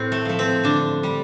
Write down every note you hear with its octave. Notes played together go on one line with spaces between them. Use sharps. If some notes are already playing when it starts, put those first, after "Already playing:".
Already playing: A2 C4
A3
F3 A3
C4
D3 D4
G3